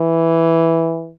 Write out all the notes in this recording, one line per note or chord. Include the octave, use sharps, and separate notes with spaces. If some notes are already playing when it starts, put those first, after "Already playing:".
Already playing: E3